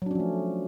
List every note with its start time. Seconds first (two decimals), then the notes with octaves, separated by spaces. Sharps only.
0.02 F#3
0.06 D4
0.11 C#4
0.15 F3
0.20 A3